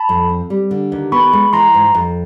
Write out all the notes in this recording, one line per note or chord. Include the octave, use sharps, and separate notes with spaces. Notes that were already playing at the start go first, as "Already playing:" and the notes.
Already playing: A5 B5
F2
C4
G3
D3
D#2
B3 B5 C#6
G#3
E3 A#5 C6
G#2
F2